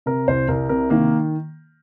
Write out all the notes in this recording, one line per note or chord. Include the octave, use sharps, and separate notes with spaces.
C3 A#4
C2 C5
C2 A#4
C3 A#4
D#3 A#3